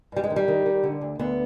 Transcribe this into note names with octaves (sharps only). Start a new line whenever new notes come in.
G2 G3
G#3
D#3
G3
D#3
D#3
D3
D2
D2 B3